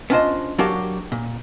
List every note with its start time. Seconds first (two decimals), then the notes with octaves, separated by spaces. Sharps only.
0.10 B3 C#4 D4 F4 C5 D#5
0.58 F#3 D4 F#4 G4 A#4 F5
1.12 A#2